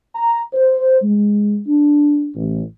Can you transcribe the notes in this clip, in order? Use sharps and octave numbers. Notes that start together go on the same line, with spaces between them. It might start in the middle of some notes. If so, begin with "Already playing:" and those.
A#5
C5
G#3
D4
A1